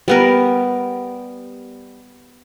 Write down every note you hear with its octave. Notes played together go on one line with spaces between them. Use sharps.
G3 B3 A#4